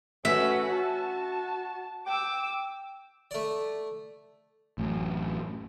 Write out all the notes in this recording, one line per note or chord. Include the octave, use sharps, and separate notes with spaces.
A3 C#4 F#4 B4 E5
F#4 A5
G5 D6 E6
A3 D5
A1 F#2